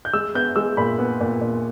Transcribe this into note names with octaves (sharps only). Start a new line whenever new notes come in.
G6
G#3 E6
B3 G6
G#3 E6
A#2 B5
B3
A#2
A#2